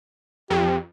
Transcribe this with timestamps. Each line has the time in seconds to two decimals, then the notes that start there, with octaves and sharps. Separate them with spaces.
0.50 F2 G4